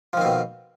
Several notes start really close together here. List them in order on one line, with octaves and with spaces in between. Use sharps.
F3 D#3 C4 B2